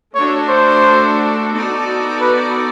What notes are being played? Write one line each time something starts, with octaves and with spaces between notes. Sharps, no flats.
A3 D4 F#4 A4 C#5
C5
B3 D#4 F#4 A4 D5
B4